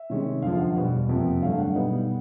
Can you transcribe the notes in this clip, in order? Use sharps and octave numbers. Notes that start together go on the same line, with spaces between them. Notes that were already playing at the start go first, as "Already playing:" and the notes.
Already playing: E5
C3 D#3 G#3 C#4
F#2 D3 F3 F5
F#5
E2 B2 G3
F2 C3 F3 A#3
G2 D3 F#3 A3 F5
F#5
B2 G3 B3 D#4